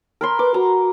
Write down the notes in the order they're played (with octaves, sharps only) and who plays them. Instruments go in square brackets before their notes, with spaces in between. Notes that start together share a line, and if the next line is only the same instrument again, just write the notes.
[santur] A#4 B5 C6
[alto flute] B4 [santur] D6
[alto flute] F#4 [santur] A#5